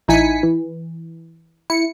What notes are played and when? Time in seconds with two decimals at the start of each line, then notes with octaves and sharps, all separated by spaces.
0.08 A1 D#4 E4 G#5 B6 C#7
0.43 E3
1.70 E4 C#7